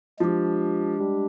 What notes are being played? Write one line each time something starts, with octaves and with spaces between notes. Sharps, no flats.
F3 G#3 D4 G4
G3